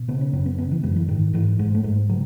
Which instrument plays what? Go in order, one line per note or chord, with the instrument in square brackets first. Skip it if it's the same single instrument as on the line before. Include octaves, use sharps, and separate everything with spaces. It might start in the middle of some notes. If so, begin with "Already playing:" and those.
Already playing: [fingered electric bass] B2
C#3 B3
C#4
F#2 C#4
B3
C#3 B3
E3
F#2 G#3
E3
G#2 D#3
G#2 E3
G#2 G#3
A3
G#2 G#3
C#3 F#3